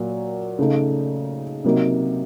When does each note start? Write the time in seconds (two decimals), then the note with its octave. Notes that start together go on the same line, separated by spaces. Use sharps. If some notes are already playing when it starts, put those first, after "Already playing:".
Already playing: A#2 F#3
0.59 C#3 A3 D#4
1.64 C3 F#3 A#3 D#4